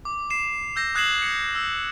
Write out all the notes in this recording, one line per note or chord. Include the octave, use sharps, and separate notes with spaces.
D6
C7 E7
E6 G6 A#6 C7 E7
D#6 F#6 G#6 C7 E7 F#7
G#6 C#7
E6